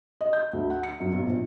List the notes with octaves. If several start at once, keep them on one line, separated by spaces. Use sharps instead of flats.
D#5
G6
D2
F#5
C#7
F#2
B1
A#1